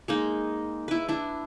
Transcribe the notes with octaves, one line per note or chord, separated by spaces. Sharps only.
G#3 A#3 D#4
E4 B4
D4 E4